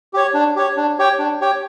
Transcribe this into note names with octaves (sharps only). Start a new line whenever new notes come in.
G4 C#5
D4
G4 C#5
D4
G4 C#5 G5
D4
G4 C#5 G5